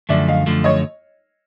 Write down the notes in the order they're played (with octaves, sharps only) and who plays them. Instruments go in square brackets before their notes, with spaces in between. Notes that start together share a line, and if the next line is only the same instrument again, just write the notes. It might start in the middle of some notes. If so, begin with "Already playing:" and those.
[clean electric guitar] F#2 D3 F3 A3 [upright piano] D5 E5
[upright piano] D#5 F5
[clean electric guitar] F#2 D3 F3 A3
[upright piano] C#5 D#5